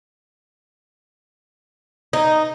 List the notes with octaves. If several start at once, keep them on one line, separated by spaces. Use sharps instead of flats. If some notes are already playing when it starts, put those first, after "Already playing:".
D#4